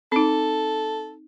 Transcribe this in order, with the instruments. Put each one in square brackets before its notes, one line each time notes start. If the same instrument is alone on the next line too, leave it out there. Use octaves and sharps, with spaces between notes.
[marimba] C4 D#4 [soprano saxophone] A4